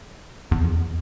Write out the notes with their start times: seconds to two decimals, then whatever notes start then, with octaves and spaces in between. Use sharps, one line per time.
0.52 E2
0.62 F2
0.74 E2